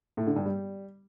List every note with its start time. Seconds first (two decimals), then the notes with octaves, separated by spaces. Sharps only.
0.17 A2
0.27 D3
0.36 G2
0.46 G3